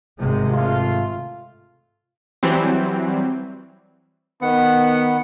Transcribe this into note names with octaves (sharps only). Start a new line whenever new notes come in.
G#1 C3 G#3
A3 F4
E3 F#3 G3 C4
D#3 B3 F#5